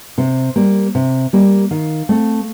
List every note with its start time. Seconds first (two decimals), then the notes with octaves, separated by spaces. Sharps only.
0.18 C3 C5
0.56 G3 A#3
0.95 C3
1.33 G3 A#3
1.71 D#3 F5
2.09 A3 C4